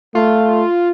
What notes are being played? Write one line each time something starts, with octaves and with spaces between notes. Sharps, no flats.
A3 F4